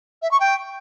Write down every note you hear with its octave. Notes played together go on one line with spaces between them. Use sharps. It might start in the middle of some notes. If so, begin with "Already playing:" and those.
E5
C#6
G5